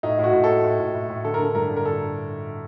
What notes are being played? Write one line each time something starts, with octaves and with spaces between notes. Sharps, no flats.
A2 D#4
A2 F#4
A2
A2 A4
A2
A2
A2
A2
D3 A4
A#4
D3 A4
G2 A#4
D3
A#4
A4